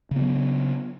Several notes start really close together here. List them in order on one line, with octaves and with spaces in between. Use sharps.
C#3 B3 F#3